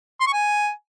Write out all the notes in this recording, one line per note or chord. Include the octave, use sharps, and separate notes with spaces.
C6
C#6
G#5